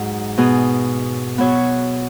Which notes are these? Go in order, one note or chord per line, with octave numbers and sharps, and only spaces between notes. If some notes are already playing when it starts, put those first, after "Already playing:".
Already playing: G#2 F#3 D#4
B2 B3 G#4
B2 F#3 B3 F#4 C#5